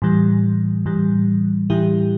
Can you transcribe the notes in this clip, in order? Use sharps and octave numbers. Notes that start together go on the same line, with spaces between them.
A2 E3 G3
A2 E3 G3
A2 E3 G3 E4 G4